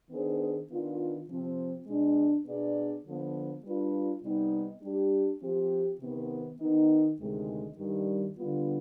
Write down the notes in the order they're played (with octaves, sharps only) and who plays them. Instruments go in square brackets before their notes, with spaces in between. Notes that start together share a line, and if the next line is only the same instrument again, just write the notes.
[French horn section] D#3 B3 D4 G#4 C5
D#3 B3 D4 F4
C3 F3 C4
B2 G#3 D4
B2 B3 D4 G#4 D5
D3 F3 B3
G3 D4 F4 B4
C3 G3 B3 D#4
G3 D4 G4
F3 C4 G4
C3 D#3 B3
D#3 B3 D#4
D2 C3 D#3 G#3
G2 D#3 G3
D3 G3 B3 F4